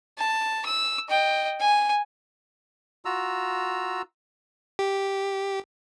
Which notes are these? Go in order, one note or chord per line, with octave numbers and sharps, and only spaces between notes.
A5
E6
D#5 G5
G#5
F4 F#4 A#5 E6
G4